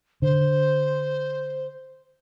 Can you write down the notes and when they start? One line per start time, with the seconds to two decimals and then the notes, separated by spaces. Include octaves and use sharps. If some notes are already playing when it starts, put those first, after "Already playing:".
0.22 D3 C5